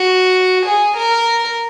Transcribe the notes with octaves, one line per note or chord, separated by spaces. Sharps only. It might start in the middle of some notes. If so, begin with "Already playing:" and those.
Already playing: F#4
G#4
A#4